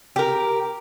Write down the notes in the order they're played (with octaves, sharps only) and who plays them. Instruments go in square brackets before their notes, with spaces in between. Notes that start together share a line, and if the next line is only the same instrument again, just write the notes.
[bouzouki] G4 A#4